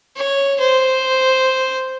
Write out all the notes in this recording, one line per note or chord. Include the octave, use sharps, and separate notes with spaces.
C#5
C5